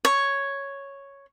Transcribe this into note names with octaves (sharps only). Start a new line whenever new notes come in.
C#5